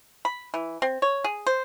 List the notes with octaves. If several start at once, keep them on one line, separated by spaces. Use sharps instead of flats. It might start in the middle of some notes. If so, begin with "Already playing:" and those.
B5
E3
C4
C#5
G#4
C5